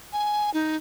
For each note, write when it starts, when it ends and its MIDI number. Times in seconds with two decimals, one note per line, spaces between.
0.13 0.50 80
0.54 0.77 63